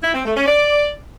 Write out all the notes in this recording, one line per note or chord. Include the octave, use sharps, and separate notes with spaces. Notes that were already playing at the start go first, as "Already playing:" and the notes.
E4
C4
A3
C#4
D5